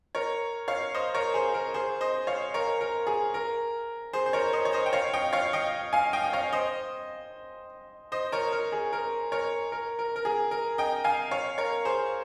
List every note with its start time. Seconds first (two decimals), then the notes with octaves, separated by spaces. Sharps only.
0.15 A#4 C#5
0.68 C#5 F5
0.94 C5 D#5
1.15 A#4 C#5
1.34 G#4 C5
1.54 A#4
1.74 G#4 C5
2.01 C5 D#5
2.27 C#5 F5
2.54 A#4 C#5
2.81 A#4
3.07 G#4
3.34 A#4
4.13 G#4 C5
4.26 C5
4.33 A#4 C#5
4.53 C5 D#5
4.65 C#5
4.73 C5 D#5
4.86 G5
4.93 C#5 F5
5.14 D#5 G5
5.33 C#5 F5
5.53 D#5 G5
5.93 F5 G#5
6.13 D#5 G5
6.24 D#5
6.33 C#5 F5
6.53 C5 D#5
8.12 C5 D#5
8.32 A#4 C#5
8.52 A#4
8.72 G#4
8.93 A#4
9.32 A#4 C#5
9.72 A#4
9.99 A#4
10.16 A#4
10.25 G#4
10.51 A#4
10.78 D#5 G5
11.04 F5 G#5
11.31 C#5 F5
11.58 A#4 C#5
11.85 G#4 C5